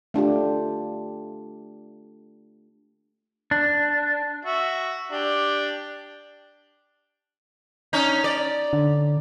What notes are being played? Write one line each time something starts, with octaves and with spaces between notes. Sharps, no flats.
A3 D4 F4 G4
D4
F#4 E5
D4 G4
C#4 D#4
D5
D3